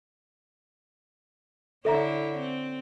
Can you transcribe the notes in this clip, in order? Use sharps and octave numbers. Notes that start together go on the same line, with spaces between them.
D3 E4 A4 C#5 E5 A#5
C4